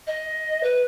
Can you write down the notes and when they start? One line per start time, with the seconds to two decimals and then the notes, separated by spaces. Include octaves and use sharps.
0.06 D#5
0.63 B4